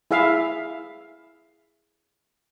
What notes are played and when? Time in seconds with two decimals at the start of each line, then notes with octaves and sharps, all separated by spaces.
0.11 E4 G#4 E5 F5